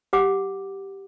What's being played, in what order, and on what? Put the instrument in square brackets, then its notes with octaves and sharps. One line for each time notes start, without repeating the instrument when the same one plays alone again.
[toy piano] G4 F#5 D6